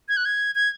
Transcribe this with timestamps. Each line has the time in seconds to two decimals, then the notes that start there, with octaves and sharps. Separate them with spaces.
0.09 G#6
0.17 F#6
0.25 G#6
0.55 G#6